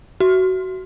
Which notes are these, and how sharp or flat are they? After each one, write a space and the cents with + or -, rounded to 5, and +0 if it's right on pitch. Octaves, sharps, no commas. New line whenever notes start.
F#4 +20